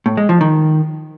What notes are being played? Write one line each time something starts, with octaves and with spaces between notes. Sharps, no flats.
A2
G#3
F3
D#3